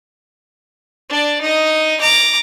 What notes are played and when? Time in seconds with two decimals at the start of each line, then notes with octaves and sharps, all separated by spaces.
1.09 D4 D5
1.41 D#4 D#5
2.00 A#5 D6